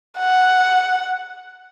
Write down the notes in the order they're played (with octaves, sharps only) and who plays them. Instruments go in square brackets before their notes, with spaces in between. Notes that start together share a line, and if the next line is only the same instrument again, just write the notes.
[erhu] F#5